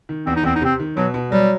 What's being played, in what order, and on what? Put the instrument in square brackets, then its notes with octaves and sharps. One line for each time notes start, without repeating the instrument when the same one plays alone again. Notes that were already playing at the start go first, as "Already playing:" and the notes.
[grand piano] D#3
[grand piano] E2 [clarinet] C4
[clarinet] D#4
[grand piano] E2 [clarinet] C4
[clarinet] D#4
[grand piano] C3 [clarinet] C4
[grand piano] D#3
[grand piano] B2 [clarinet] F#3
[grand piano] B2
[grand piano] F#3 [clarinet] G3